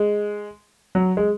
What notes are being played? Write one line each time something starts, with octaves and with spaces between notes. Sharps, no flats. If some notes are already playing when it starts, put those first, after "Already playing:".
Already playing: G#3
F#3
G#3